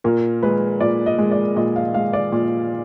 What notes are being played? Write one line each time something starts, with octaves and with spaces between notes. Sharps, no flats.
A#2 A#4
G#3 B4
A#2 D5
D#5
G#3
D5
A#2 D#5
F5
G#3 F5
D5
A#2